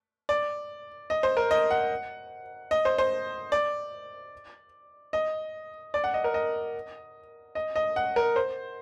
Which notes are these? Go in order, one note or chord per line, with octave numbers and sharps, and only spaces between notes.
D5
D#5
C5
A#4
D#5
F#5
D#5
C5
C5
D5
D#5
D5
F#5
D#5
A#4
D#5
D#5
D#5
F#5
A#4
C5